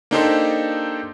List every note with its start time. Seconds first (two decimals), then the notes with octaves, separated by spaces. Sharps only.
0.11 A#3 D4 D#4 G4 A4 C5